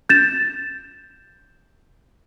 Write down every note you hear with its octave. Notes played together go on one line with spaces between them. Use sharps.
G6 A6 E7